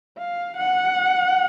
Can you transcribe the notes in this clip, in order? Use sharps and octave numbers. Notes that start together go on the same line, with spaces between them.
F5
F#5